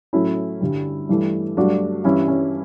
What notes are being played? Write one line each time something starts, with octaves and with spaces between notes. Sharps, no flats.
A2 F#3 A3 C#4 E4
G2 D3 G3
G2 E3 A3
G2 F#3 A3 D4 F#4
G2 E3 G3 C#4 E4
C#4